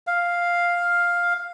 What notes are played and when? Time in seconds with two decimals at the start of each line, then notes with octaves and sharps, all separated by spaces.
0.07 F5